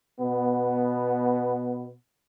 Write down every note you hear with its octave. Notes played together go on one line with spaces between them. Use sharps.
B2 B3